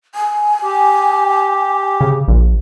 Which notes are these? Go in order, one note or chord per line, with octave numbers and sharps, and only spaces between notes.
G#5
G4
C#3
A#1